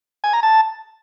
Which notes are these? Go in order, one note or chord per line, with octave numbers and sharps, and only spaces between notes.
G#5
A#5
A5